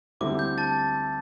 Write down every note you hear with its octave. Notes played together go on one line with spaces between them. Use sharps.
D2 D3 G3 C4 E4 D6
G6
A5 A6